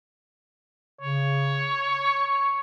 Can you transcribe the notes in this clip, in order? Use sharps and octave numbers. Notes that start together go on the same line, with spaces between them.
C#3 C#5
C#6